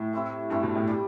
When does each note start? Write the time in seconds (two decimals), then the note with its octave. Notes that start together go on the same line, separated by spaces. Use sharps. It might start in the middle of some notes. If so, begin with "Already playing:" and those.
Already playing: A2
0.13 A3 C4 E4 G4
0.50 G2 A3 C4 E4 G4
0.63 B2
0.75 A2
0.87 G3 D4 G4